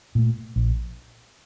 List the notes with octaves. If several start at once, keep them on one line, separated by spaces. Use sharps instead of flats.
A#2 A3
A#1